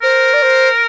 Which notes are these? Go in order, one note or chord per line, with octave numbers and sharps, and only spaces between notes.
A#4 C5
D5
C5